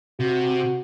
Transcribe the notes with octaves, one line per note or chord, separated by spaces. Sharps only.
C3 F#4